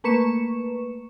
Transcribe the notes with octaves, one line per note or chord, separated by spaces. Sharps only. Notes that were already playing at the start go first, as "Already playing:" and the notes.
A3 A#3 B4 C#6 C#7 E7